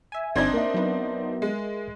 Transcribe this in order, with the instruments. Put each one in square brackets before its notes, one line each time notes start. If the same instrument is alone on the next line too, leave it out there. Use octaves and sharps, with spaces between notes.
[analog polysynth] E5 G#5
[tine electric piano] G1 G#6 [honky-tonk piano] C4 D4 D#4
[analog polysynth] A#3 [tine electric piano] A#4 E5
[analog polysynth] F#3 B3
[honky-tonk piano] G#3